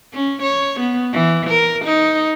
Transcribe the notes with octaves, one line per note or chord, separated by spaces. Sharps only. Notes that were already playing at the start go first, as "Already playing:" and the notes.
C#4
C#5
B3
E3
A#4
D#4